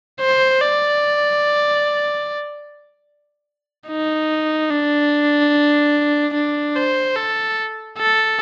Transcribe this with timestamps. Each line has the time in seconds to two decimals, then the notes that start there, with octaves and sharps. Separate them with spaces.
0.20 C5
0.61 D5
3.89 D#4
4.70 D4
6.34 D4
6.76 C5
7.16 A4
7.98 A4